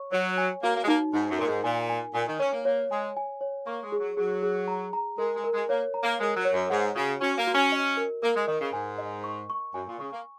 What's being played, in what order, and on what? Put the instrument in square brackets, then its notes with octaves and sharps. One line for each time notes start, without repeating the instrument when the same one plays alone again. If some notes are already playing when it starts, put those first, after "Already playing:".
Already playing: [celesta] C#5 C#6
[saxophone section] F#3 [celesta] C#5
[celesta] G#5
[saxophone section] A#3 [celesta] F#4
[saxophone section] A#3
G#3
[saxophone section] A#3 [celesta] D#4
[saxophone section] G#2 [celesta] D#4
[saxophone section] F#2
[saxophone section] A#2 [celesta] A#4
[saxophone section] G#2
[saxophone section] A#2 [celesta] G#5
[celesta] G#5
[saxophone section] A#2 [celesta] G#5
[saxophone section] D#3
[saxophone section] C#4 [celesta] C#5
[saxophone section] A#3
[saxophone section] A#3 [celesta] C#5
[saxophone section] G#3 [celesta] G#5
[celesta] G#5
C#5
[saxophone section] A#3 [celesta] C#6
[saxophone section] G#3
[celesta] G#4
[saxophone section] F#3
[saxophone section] F#3 [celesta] G#4
[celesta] G#4
A#5
A#5
[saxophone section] G#3 [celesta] A#4
[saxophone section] G#3
[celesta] A#4
[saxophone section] G#3
[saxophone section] A#3 [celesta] C#5
[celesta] A#5
[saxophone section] A#3
[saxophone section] G#3 [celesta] A#4
[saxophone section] F#3
[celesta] C#5
[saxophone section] F#2
[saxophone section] G#2 [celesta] F#5
[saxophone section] C#3 [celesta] F#4
[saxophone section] C#4 [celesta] F#4
[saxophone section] A#3
[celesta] F#4
[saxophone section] C#4
[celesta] D#5
A#4
[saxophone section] A#3 [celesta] A#4
[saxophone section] G#3
[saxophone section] D#3 [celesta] D#5
[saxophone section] C#3
[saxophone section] G#2 [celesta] G#5
[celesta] D#5
C#6
C#6
[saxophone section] F#2 [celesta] G#5
[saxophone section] A#2
[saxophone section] C#3 [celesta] C#6
[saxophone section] A#3